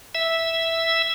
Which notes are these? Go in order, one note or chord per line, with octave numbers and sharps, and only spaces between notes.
E5 E6